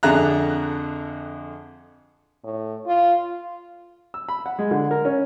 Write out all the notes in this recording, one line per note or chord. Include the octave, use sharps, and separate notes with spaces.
F2 D3 G#4 E5 A#5 F#6
A2
F4
E6
B5
F#5
G#3
D3
A#4
C#4